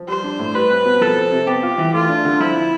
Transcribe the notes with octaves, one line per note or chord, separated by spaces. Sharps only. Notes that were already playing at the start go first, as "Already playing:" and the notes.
Already playing: F3
G3 C5
D4
A2
G3 B4
C4
B2
F3 A4
C4
C3
B3 G4
F4
E3
A3 F4
D4
D3
F3 E4
C4